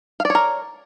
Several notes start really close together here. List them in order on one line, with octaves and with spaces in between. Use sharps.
F5 D5 C#5 A#4